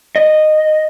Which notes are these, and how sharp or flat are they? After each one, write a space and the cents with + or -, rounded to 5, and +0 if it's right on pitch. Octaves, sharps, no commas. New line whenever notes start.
D#5 -10